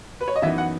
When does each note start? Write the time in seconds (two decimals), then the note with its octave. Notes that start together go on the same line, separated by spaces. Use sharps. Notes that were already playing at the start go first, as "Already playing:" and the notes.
0.21 B4
0.28 C#5
0.36 D#5
0.42 F#2 E3 B3 D#4 E5
0.58 F#5